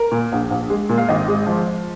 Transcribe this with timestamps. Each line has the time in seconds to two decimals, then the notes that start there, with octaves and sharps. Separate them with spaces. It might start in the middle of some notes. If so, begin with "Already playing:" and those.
Already playing: A#4
0.12 A#2
0.32 A#1
0.50 A#1
0.70 G#3
0.89 A#2
0.97 F5
1.08 G#1 D#5
1.28 G#3
1.47 F3